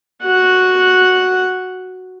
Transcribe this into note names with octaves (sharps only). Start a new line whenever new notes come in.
F#4 F#5